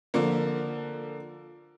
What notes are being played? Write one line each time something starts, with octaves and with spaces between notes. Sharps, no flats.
D3 F3 A#3